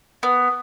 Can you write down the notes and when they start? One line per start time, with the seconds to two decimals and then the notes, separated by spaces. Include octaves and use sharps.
0.23 B3